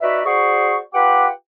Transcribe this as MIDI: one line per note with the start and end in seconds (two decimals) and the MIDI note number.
0.02 0.21 63
0.02 0.21 66
0.02 0.21 71
0.02 0.21 74
0.02 0.21 76
0.25 0.77 66
0.25 0.77 68
0.25 0.77 72
0.25 0.77 74
0.25 0.77 85
0.94 1.27 65
0.94 1.27 67
0.94 1.27 71
0.94 1.27 78
0.94 1.27 79
0.94 1.27 86